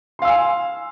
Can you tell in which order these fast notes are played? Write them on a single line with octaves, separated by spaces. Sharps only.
C6 F5 E6 G#5